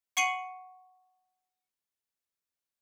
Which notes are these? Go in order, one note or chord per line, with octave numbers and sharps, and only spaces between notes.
F#5 C#6 C7 C#7 D#7 F#7